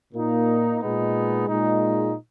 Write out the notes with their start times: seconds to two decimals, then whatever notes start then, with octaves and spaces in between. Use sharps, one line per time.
0.13 A#2 A#3 D#4
0.80 A#2 G#3 B3 D#4
1.48 A#2 G#3 D#4